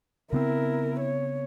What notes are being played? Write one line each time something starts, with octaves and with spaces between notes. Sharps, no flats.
C#3 B3 C4 E4 A#4
C#5